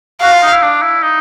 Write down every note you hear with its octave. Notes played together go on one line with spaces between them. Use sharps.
F#4 F5
F4
D#4
E4
D4
E4
D#4